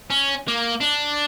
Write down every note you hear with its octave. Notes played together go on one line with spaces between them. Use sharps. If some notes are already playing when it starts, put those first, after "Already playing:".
C#4
A#3
D4